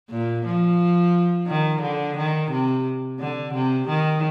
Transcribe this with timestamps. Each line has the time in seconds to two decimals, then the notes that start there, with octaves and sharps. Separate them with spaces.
0.10 A#2
0.45 F3
1.47 D#3
1.82 D3
2.17 D#3
2.51 C3
3.20 D3
3.54 C3
3.88 D#3